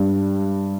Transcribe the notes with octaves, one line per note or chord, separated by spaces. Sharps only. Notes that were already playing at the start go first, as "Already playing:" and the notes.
Already playing: G2 G3